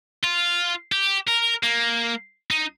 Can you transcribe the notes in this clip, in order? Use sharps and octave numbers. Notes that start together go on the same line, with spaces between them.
F4
G4
A#4
A#3
D#4